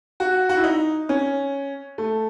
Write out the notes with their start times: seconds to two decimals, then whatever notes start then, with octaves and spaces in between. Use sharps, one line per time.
0.20 F#4
0.49 F#4
0.57 E4
0.64 D#4
1.09 C#4
1.98 A3